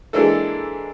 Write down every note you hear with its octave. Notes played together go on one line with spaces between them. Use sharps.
E3 G#3 A#3 D4 E4 A4